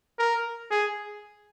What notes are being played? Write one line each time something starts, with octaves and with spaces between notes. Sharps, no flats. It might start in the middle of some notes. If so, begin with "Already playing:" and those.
A#4
G#4